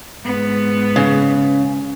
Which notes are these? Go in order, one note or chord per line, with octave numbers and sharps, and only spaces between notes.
G#2 B3
C#3